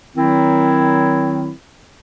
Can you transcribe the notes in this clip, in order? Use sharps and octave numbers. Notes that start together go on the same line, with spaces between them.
D#3 F#3 C4 E4